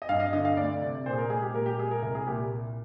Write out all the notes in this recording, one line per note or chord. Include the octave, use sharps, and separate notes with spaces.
D#5
G2 F5
D#5
D3 D#5
F5
D2 D5
C3
A#2 C5
G#4
A#4
G#3 G#4
G4
A#2 A#4
G4
G#3 G#4
A#4
C2 A#4
G#4
A#2 G4